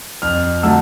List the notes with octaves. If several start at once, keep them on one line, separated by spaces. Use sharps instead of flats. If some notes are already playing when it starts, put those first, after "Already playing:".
F2 F6
D3 F#3 A3 E6